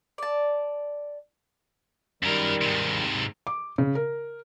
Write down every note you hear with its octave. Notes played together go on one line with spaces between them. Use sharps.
D5 A5
F#2 D#3 G3 A#4
G#2 C3
D6
C#3
A#4